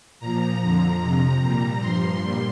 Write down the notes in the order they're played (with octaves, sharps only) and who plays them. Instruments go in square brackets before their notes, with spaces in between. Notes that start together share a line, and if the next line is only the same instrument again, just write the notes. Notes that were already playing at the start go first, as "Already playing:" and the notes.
[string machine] A#2 F3 A#5
F2 D3 F3
F2 C3 F3
A#2 G3 A#5
G2 F3 C6
A#2 G3